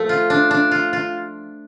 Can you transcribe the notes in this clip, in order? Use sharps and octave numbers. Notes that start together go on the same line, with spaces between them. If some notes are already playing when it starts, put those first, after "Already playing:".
Already playing: F3 A3
F4
D4
D4
F4
F4